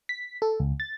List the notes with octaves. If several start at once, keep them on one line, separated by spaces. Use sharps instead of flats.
B6
A4
C#2
A6